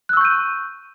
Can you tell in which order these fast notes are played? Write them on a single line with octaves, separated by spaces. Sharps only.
F#6 E6 C#6 G6 D#7